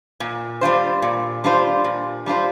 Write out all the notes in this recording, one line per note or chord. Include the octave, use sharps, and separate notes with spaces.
A#2
G3 D4 F4 C5
A#2
G3 D4 F4 C5
A#2
G3 D4 F4 C5